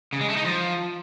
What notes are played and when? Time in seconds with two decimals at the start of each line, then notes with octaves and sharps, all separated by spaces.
0.13 C#3
0.21 G#3
0.29 A3
0.37 D#4
0.45 F3